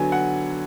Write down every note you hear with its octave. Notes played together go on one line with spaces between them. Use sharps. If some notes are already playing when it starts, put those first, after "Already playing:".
Already playing: D3 F#3 B3 G#5
F#5